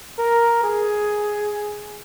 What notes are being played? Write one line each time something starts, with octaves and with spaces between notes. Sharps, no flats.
A#4
G#4